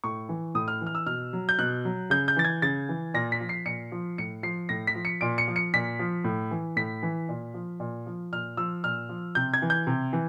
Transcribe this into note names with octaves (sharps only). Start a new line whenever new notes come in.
A2 C#6
E3
A2 D#6
F6
E3
F6
E6
B2 F6
F#3
G6
B2 F#6
F#3
C#3 G6
G6
E3 A6
G#6
C#3 A6
E3
A#2 A#6
B6
F3
C7
A#2 C#7
F3
A2 C#7
F3 C7
A2 A#6
B6
F3
C#7
A#2 D7
C#7
F3
C#7
A#2 B6
F3
A2
E3
A2 B6
E3
A#2
F3
A#2
F3
A#2 F6
F3 E6
A#2 F6
F3
C3 G6
G#6
E3
G6
C3
E3